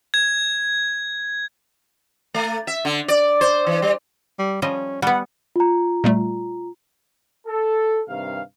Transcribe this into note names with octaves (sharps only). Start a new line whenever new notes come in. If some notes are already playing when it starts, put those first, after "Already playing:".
G#6
A3
E5
D3
D5
C5
E3
G3
G3
F3 G3 C#4 D#5
G3 B3 F#5
F4 A#5
A#2 G3 A3
A4
G2 C3 D#3 F5